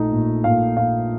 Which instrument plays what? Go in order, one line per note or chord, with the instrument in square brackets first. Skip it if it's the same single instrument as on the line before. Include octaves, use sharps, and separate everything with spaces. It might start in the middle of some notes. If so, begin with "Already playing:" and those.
Already playing: [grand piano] A#1 A3 D#4
A#2
A#2 F5
A#2 F5